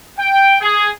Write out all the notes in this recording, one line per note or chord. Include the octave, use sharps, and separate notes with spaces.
G5
G#4